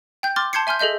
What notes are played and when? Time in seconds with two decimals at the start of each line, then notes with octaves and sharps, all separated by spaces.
0.23 G5 G6
0.36 C6 D6 F6 A6
0.53 A5 C6 G6 G#6 C7 C#7
0.67 E5 G#5 C6 F6 G6
0.79 G#4 A4 D#5 E5 G6